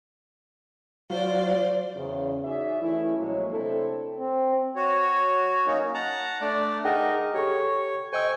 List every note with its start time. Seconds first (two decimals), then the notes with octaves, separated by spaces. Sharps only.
1.10 F#3 F4 C5 D5
1.95 E2 C#3
2.44 D#4 F#4 G#4 D5 E5
2.81 E3 A3 C#4 E4
3.17 A#1 F#3 G#3 A#3 F#4 C#5
3.51 C3 A3 C4 D4 E4 A4
4.16 C4
4.76 F#4 C#5
5.66 F#3 A#3 C#4 D#4
5.94 F#5 A5 A#5
6.41 A3 D4 D5
6.84 D#4 G#4 A#4 D#5 F#5 G5
7.34 G4 A4 C#5 C#6
8.13 C5 D#5 G5 G#5 C#6 E6